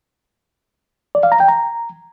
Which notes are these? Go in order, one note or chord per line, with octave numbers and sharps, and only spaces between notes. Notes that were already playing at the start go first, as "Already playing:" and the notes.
D5
F5
A#5
G5
A#5